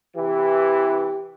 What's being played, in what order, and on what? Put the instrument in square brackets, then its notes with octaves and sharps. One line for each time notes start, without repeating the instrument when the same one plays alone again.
[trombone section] C3 E3 [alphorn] G4